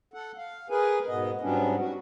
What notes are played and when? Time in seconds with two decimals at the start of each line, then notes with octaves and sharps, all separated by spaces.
0.14 A4 F#5
0.37 F5
0.70 G#4 A#4 B4 G#5
1.08 G#2 B2 B3 D#5
1.41 G#2 F#3 G3 B3 C#4 D4
1.78 F#4